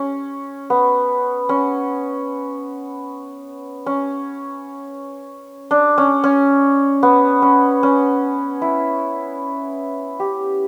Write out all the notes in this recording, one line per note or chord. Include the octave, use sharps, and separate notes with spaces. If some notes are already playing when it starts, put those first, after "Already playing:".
Already playing: C#4
B3
C#4
C#4
D4
C#4
C#4
B3
C#4
C#4
E4
G4